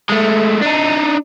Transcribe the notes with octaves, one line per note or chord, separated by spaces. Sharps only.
G#3 A3
D4 D#4